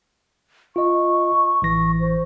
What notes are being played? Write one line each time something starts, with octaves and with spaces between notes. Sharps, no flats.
F4 D#5 C#6
A1 E3 A#6
C5